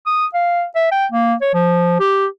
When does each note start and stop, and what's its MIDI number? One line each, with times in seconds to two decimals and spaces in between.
0.06 0.26 87
0.34 0.64 77
0.75 0.88 76
0.91 1.06 79
1.12 1.34 58
1.41 1.52 73
1.54 1.97 53
2.00 2.26 67